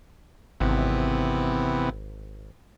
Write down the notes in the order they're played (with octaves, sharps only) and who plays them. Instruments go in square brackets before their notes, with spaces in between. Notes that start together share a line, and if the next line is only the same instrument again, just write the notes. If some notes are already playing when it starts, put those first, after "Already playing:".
[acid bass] G#1 [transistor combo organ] C3 E3 B3